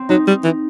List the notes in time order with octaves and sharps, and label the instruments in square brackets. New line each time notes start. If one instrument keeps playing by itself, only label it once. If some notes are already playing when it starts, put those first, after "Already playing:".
Already playing: [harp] C4
[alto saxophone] F#3 [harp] D#4
[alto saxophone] G3
E3